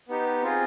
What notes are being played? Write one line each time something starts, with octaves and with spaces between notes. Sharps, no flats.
B3 D#4 G4
C4 F4 G#4